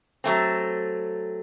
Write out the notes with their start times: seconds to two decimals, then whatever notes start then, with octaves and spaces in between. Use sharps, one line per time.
0.24 F#3 A3 C4